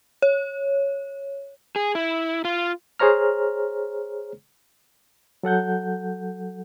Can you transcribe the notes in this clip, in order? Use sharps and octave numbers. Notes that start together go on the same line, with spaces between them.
C#5
G#4
E4
F4
G#4 C5 C#5 A#5 F6
F#3 A4 F#5 G6